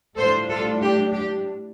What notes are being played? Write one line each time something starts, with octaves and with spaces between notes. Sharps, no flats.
A2 G3 D4 F4 A4 C5
F4 A4
G4
G4